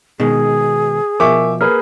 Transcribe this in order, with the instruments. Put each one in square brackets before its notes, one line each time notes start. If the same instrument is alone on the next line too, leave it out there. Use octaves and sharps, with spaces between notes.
[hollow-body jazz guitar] B2 D#3 G#3 [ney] G#4
[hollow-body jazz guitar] B2 F3 [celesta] A#4 G#5 [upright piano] E5 C#6 D6
[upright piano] A#3 G#4 B4 [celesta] F6